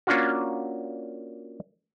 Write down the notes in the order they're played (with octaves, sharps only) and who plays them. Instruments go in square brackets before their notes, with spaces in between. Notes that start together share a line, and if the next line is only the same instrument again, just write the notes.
[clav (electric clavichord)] A#3 C#4 D4 F4 F#4